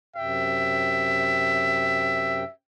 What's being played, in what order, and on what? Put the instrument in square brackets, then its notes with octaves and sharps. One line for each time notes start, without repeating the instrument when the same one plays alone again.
[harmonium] F#2 C3 G5 [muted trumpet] E5